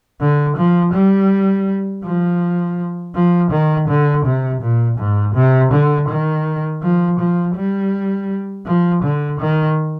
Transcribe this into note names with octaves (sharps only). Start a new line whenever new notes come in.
D3
F3
G3
F3
F3
D#3
D3
C3
A#2
G#2
C3
D3
D#3
F3
F3
G3
F3
D3
D#3